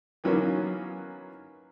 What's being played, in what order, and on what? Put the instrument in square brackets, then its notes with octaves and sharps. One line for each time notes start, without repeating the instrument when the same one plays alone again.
[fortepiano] D#3 E3 F#3 A#3 B3 C#4